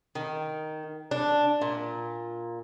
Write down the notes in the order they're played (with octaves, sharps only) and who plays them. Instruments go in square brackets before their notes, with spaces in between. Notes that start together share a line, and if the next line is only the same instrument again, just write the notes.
[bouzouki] D#3
D4
A#2